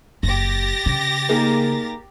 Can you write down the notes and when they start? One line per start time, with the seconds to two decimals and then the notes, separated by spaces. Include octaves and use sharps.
0.23 F#1 G4 A6 A#6
0.86 C#3
1.29 A#3 D#4 G#4